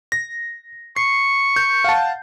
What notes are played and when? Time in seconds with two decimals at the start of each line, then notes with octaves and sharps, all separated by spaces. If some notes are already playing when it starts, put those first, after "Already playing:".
0.12 A#6
0.96 C#6 C7
1.56 G6
1.84 F5 F#5 A5